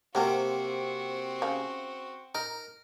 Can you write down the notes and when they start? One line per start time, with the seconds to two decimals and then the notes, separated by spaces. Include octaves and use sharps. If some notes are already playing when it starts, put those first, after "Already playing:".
0.15 C3 F#3 A#3 C4 F#4 A#4
1.42 C#3 F5
2.35 D#4 A#4